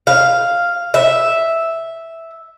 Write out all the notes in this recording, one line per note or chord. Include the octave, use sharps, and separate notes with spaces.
F5
E5